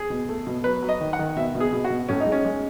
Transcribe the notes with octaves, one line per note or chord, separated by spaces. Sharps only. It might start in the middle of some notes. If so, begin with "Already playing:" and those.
Already playing: G#4
B2
A3
B2
F#3 B4
F#3
D#5
D#3
F#5
D#3
B2 E5
B2
G#4
B2
F#4
B2
A2 C#4
D#4
G#3
C#4
G#3